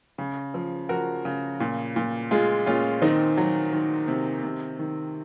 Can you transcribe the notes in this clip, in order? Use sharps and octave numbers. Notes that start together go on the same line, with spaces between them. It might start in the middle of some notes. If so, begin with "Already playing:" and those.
C#3
F3
F3 F#4 A#4
C#3
A#2
A#2
G#3 F4 G#4
A#2 C#4 F4
D#3 C4 D#4
F#3
D#3
C3
C3
D#3